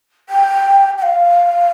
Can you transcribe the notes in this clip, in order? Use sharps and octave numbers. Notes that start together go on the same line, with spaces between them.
G5
G5
F5